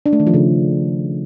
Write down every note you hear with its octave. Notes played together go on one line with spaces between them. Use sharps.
D4
A3
D#3
F3
C#3